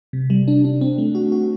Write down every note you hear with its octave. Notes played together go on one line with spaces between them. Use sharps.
C3
G3
D4
D4
C4
A3
F#4
F#4